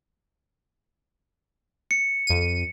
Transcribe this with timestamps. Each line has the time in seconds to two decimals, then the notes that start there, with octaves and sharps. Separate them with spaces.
1.91 C#7
2.27 F2 D#7